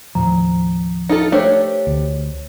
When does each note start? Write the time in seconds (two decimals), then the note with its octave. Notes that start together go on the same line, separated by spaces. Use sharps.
0.15 D#2 A2 F3 A#5
1.09 D#4 F4 A4
1.32 A3 D4 G4 A#4 C5 C#5
1.87 D2